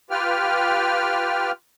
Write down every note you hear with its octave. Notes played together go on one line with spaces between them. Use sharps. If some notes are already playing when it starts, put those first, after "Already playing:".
F4 G4 B4 G5 F6